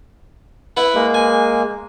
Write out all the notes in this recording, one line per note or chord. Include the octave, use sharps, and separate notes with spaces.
E4 B4 F#5
G#3 A#3
G#5